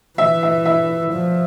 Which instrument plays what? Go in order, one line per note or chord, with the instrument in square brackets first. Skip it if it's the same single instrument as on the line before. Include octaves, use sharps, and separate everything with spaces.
[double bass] E3 [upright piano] E5
[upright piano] E5
E5
[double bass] F3